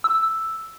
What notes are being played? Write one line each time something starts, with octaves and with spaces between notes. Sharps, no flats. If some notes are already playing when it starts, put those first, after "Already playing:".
E6